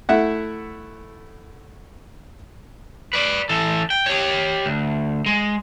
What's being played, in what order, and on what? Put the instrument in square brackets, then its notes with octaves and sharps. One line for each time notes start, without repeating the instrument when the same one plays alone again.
[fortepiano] A3 E4 E5 F#5
[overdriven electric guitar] B4 D5
E3 A4
G5
G4 C#5
D2
G#3